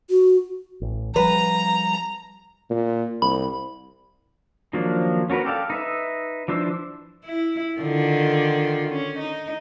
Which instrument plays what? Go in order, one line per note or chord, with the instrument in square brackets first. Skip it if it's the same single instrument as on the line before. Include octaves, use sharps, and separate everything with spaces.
[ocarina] F#4
[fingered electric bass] A1
[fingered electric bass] F3 G3 [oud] B4 [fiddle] A#5
[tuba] A#2
[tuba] C2 [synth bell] B5
[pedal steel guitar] D#3 F3 F#3 A#3 D4
C#4 F#4 A#4 B4
G4 A4 D5 F5
D#4 B4 E5
E3 F3 D4 C5 E6
[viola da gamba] E4
D3 D#3 F4
C#4
D#4